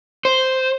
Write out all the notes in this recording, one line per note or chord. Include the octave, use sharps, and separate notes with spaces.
C5